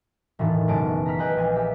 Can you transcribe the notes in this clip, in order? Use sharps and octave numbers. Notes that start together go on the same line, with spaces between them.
E1 A2 D#3 E3 A4
F#1 B2 G#3 A5 D7
A#5 B5 F6 B6
G#4 B4 D#5 G5
A#1 G#5 F6
G4 E5